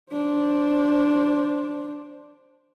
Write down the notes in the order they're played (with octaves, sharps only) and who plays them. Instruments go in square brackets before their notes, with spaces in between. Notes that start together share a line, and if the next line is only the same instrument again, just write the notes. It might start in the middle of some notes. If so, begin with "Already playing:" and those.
[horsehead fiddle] D4 C5